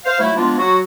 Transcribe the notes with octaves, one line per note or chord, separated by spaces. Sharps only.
C5 F5
F#3 A3 E4
F3 G#3 A#3 B3 D4 F4
F#3 F#4